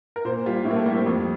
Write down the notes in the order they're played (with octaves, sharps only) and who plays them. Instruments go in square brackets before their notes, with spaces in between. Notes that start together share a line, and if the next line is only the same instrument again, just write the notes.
[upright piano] A#4
A#2 C5
G3 F4
A2 E4
A#3
A3
G3 A#3
C4
F2